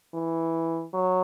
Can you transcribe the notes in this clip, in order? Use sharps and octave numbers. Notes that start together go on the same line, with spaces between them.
E3
F#3